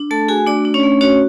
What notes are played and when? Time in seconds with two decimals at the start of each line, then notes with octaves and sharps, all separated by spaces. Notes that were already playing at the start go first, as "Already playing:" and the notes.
Already playing: D4
0.11 A3 A4 A5
0.28 F#4 G#4 G#5
0.46 A3 D4 D5
0.65 D4
0.74 C#4 C#5
0.83 A3
1.01 C#4 F#4 C#5